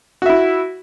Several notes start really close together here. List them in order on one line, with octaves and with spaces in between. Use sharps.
F#4 E5 E4